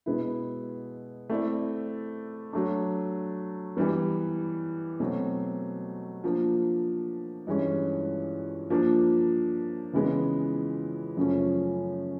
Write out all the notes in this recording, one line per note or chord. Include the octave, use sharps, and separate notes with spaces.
B2 G#3 B3 E4
A3 C4 E4 A4 D5
F#3 A3 D4
E3 G3 B3
B2 F#3 A3 C4
F3 A#3 D4
G2 E3 G#3 C#4
F3 A#3 D4
C#3 E3 G#3 B3
F#2 C#3 F3 A3 C#4